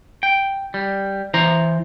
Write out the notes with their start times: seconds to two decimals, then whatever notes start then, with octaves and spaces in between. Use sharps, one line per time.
0.23 G5
0.74 G3
1.34 E3 C5 A#5